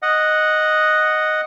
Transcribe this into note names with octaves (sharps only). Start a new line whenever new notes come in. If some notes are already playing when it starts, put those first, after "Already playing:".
D#5 F#5